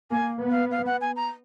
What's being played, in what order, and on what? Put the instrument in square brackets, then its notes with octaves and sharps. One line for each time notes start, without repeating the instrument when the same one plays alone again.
[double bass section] A#3 [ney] G#5
[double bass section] B3
[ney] F5
F5
F#5
G#5
A#5